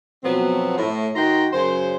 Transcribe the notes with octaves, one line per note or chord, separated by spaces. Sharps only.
B2 F3 F#3 B3 C4
A2
D#3 D#4 F#4 G5 A#5 C6
F#2 C#3 C5